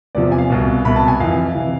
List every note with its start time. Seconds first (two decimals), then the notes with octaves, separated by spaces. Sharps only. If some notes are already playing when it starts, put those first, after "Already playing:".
0.15 E2 C3 F3 D5
0.32 G#5
0.38 F5
0.50 C2 B2
0.85 C2 B2 B5
0.96 A5
1.08 G#5
1.20 F2 E3 F5
1.55 C3 E3